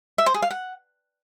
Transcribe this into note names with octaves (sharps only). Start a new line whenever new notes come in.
E5
C5
G#4
F5
F#5